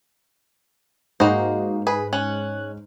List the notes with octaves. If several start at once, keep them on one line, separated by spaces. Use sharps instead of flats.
G#2 A#3 D#4 F#4 G#4 C5
G#4 B4
C#4 F#6